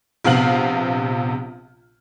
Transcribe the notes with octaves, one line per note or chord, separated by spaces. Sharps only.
A#1 C3 B3 F5 F6 F#7